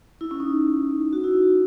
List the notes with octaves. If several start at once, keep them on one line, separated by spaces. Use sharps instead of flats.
E4
C#4
D#4
F#4
E4